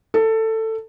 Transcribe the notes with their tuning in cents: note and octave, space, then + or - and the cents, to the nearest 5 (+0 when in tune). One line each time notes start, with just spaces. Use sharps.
A4 +15